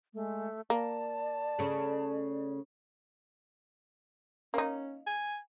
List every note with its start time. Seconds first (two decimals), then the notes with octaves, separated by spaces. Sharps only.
0.14 G#3 A3
0.70 A#3 D5 A5
1.59 C#3 A3
4.54 A#3 C#4 D#4
5.06 G#5